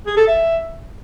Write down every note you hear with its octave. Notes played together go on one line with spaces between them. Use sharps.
G#4
A4
E5